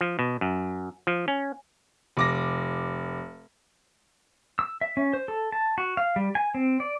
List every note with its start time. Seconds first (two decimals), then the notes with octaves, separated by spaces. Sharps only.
0.01 F3
0.19 B2
0.41 F#2
1.07 F3
1.28 C#4
2.17 F1 D6 A#6
4.59 E6
4.81 E5
4.97 C#4
5.13 C5
5.28 A4
5.52 A5
5.78 F#4
5.97 F5
6.16 G3
6.35 G#5
6.55 C4
6.80 D5